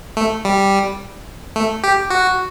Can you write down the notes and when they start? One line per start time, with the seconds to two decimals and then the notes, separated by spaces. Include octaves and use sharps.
0.17 A3
0.45 G3
1.56 A3
1.84 G4
2.10 F#4